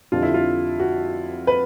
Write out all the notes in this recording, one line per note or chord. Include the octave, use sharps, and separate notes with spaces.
F2 D3 G3 F4
E4
F4
F#4
B4